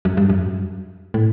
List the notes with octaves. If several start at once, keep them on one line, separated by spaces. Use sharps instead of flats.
F#2
G2
F#2
A2